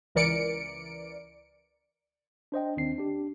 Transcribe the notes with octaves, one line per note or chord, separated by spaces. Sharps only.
C#2 E3 A#4 D5 C#7 D7
D4 C5 D#5 G5
D#2 D#3 C4 D4 C7
D4 G4